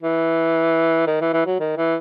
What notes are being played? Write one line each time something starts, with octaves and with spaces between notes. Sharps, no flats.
E3
D#3
E3
E3
F#3
D#3
E3